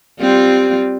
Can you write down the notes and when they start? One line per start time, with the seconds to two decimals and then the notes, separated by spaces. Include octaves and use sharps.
0.20 G3 C4 F4